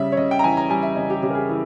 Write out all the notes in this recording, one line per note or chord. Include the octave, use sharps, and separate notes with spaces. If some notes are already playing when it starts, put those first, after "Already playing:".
Already playing: C#3 G3 E5
C#5
C#3 D#5
G5
A#5
E3 G#5
A#5
G3 G#5
E5
C#3 D#5
G4
C#3 G4
A#4
G#4
E3 E4